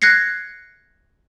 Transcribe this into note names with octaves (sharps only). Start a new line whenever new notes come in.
F#6 G#6 A#6 C7 C#7